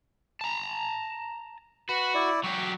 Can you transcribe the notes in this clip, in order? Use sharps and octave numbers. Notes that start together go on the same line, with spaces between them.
A5 A#5
F#4 B4 B5
E4 D5
F#3 G4 C#6